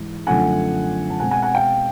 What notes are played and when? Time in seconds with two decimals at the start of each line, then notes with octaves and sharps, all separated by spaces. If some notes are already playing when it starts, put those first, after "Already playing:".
Already playing: G#2 E3
0.26 F#2 D3 F3 A3 C4 F#5 G#5
1.10 A5
1.19 B2 G#3 C4 F#5 G#5
1.31 F#5 G#5
1.42 F#5 G#5
1.54 F5 G5